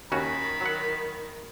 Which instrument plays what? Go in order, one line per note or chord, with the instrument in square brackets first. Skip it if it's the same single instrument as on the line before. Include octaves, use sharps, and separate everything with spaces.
[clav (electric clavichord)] D#2 C#4 F#4 [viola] D#3 [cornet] B5
[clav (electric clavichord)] F#3 F#5